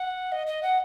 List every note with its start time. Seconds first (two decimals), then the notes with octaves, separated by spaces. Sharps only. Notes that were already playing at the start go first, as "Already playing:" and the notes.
Already playing: F#5
0.32 D#5
0.47 D#5
0.63 F#5